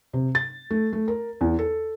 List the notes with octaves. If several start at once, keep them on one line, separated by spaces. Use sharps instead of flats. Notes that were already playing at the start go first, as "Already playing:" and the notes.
C3
A6
A3
A3
A#4
E2
A4